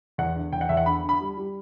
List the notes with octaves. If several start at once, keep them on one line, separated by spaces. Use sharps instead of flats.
E2 F#5
D3
E2 G5
F#5
E2 E5
F#5
D3 B5
D3
B5
G3
G3